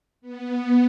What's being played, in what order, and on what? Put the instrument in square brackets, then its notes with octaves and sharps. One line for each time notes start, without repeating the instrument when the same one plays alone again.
[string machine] B3